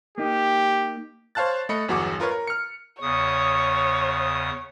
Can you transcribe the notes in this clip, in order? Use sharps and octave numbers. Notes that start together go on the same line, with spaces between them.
A#3 D#4 G4
C5 C#5 F5 A5 F#6 A6
A3 D#5 B5 C#7
G1 E2 F#3 F#4 G#4 D6
F4 A#4 B4 C#5 F5
A#4
F6 C#7
E2 C#3 C#5 D#6